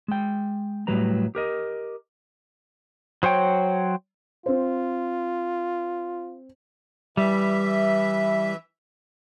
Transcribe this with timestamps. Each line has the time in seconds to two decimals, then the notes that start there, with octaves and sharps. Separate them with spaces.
0.08 G#3 G5
0.87 A2 F#3 G3 B4 A#5
1.35 G4 A#4 D#5
3.23 F#3 C5 C#5 G5
4.46 C4 F4 C5
7.17 E3 G3 E5